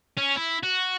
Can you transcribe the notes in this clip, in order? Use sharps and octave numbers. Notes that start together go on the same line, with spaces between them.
C#4
E4
F#4